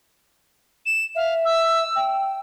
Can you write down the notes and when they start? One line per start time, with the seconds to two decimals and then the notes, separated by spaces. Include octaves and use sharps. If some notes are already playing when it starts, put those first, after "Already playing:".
0.85 E7
1.15 E5 F5
1.45 E6
1.96 G5